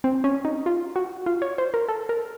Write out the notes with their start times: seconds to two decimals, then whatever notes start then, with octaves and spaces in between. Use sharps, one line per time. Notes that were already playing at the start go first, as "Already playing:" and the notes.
0.04 C4
0.24 C#4
0.45 D#4
0.66 F4
0.96 F#4
1.26 F4
1.42 C#5
1.58 C5
1.74 A#4
1.89 A4
2.09 A#4